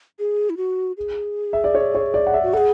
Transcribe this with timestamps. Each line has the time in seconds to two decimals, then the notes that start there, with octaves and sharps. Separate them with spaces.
0.19 G#4
0.50 E4
0.57 F#4
0.97 G#4
1.53 E5
1.64 D5
1.75 C#5
1.95 C#5
2.14 D5
2.27 F#5
2.34 E5
2.43 F#4
2.53 A4 F#5
2.57 G#4